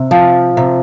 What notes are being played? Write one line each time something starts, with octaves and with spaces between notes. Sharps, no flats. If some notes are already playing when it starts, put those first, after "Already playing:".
Already playing: C3
F3
C3